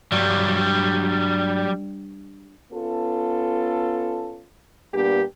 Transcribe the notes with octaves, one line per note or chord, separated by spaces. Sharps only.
G2 F#3 G3
B3 C#4 F4 A4
A#2 G3 B3 D4 G4